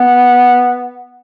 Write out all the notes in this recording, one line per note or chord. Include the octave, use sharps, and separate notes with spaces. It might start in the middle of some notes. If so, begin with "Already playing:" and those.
Already playing: B3